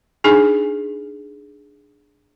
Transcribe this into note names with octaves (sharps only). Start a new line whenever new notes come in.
D4 D#4 G#4 G#5